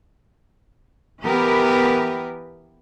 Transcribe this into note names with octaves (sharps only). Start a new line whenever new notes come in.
E3 B3 G4 A#4 B4